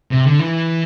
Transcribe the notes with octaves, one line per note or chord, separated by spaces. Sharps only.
C3
D3
E3